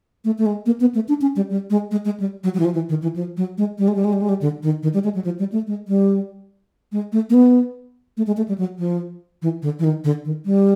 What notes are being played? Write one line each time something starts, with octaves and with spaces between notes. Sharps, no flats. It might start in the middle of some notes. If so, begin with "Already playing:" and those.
A3
A3
G#3
A#3
B3
A3
D4
C#4
G3
G3
G#3
G#3
G#3
G3
F#3
F#3
E3
F3
E3
D#3
E3
F3
F#3
G#3
G3
G#3
G3
G#3
G3
G#3
G3
D3
D#3
D#3
G3
G#3
F#3
F3
G3
A3
G#3
G3
G#3
A3
A#3
B3
A3
G#3
A3
G3
F#3
F3
E3
D3
E3
D#3
D3
D#3
G3